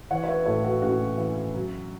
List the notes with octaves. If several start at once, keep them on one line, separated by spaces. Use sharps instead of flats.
E3 C#5 F#5
C#5
B4 E5
A2 A4 C#5
F#4 B4
A2 C#4 F#4
E3
F#3